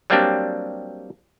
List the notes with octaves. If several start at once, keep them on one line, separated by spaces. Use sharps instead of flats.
F#3 G3 A#3 C4 D4 G4